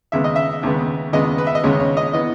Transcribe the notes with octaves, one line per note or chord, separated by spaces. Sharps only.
D#2 C#3 G#3 B3 E5
D#5
E5
D#2 C#3 G#3 B3
D#2 C#3 G#3 B3 D#5
B4
E5
D#5
D#2 C#3 G#3 B3 C#5
C#5
D#5
E3 B3 D#5